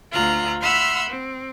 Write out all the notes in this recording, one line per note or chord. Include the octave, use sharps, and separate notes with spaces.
D2 F4 A#5 F#6
E5 F#5 B5 C6 E6 F6
C4